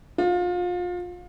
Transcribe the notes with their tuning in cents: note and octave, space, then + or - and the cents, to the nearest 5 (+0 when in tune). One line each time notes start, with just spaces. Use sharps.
F4 +30